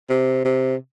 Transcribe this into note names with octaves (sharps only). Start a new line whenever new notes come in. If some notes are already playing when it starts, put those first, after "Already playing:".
C3
C3